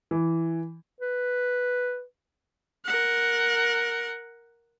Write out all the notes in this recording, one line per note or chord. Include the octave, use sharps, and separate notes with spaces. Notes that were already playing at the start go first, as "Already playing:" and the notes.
E3
B4
A#4 F#5